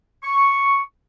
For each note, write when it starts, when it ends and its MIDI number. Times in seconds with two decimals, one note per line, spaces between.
0.23 0.80 85